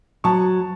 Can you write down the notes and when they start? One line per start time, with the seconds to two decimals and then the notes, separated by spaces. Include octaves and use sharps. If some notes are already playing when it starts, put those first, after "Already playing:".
0.24 F#3 A5 C#6